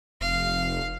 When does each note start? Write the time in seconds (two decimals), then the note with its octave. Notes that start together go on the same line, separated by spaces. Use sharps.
0.21 F1 F5